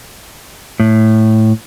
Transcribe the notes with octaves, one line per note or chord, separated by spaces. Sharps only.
A2